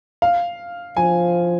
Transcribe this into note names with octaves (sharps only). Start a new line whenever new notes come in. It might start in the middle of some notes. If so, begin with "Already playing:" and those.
F5
F3 G#5